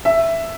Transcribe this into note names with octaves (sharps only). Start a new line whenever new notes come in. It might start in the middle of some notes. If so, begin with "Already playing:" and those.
E5